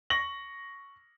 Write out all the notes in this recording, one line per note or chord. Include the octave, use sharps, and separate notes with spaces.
C#6 A#6 F#7